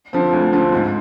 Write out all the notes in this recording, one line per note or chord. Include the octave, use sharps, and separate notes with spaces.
D3 F3 C4
D2
D3 F3 C4
G#2